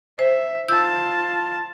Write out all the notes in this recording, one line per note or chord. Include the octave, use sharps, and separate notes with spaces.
C5 E5
F4 A5 E6 G6